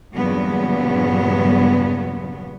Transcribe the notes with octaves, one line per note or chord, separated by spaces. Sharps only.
E2 G2 A#2 C#3 F#3 B3